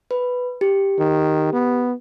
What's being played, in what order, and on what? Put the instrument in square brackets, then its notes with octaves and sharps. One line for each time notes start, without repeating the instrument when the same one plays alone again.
[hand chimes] B4
G4
[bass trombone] D#3
B3